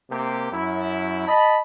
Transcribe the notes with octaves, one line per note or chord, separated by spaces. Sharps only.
C3 A#3 G4
F#2 E4
D#5 A5 B5